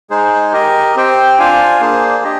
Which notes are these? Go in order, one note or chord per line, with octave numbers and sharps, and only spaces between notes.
G#3 D#4 G#4 C5
G4 A#4 D#5
C4 G4 C5 G5
D4 F4 C5 F5 G#5
A#3 D4 G#4 C5
D4 G4 D#5